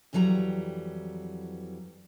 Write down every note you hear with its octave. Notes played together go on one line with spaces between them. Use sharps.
F2 E3 F#3 G3 G#5 A#5